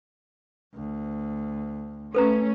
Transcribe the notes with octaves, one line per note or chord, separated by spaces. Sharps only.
D2
A3 C#4 A4 B4 A#5